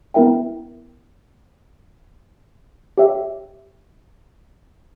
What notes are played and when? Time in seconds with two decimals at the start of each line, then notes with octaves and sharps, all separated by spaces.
0.14 B3 E4 A#4 E5 G5
2.98 G4 C#5 E5 G5